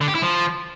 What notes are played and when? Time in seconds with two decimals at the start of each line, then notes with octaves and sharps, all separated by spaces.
0.01 D3
0.08 G4
0.15 E4
0.22 F3